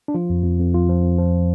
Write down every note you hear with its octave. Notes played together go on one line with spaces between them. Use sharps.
D4
F3 F4
F2
F2
F2
F2 F4
F3
F2
F3